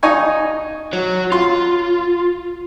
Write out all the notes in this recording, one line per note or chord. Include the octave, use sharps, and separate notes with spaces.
D#4 G#5 C#6
F#4 C#5
F4 C6